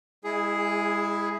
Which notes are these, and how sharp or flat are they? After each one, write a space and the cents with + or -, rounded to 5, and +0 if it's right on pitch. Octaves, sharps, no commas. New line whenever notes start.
G#3 -30 E4 +0 G#4 +5